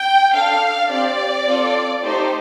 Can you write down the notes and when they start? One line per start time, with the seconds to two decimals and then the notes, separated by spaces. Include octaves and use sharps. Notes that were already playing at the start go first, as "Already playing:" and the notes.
Already playing: G5
0.34 D4 A4 F5
0.90 C4 G4 D5
1.47 C4 F4 A4
2.03 A3 D#4 G4 C5